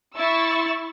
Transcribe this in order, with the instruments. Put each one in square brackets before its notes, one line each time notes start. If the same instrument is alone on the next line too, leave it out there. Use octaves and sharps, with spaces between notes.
[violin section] E4 C#6 E6 A6